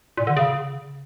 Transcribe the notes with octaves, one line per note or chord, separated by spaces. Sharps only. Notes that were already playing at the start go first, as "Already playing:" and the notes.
A#2
D3
C#3